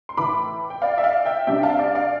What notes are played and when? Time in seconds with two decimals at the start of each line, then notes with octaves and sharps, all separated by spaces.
0.09 C6
0.17 A2 E3 A3 B5 D6
0.70 G5
0.82 D5 F5
0.98 E5
1.04 D5 F5
1.25 E5 G5
1.47 C3 G3 D4 E5 G5
1.63 F5 A5
1.79 D5 F5
1.95 D5 F5